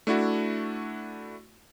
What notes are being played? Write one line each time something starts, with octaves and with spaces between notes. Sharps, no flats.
A3 D4 E4 F#4